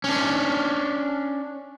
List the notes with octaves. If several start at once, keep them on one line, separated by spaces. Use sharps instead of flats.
C#4 D4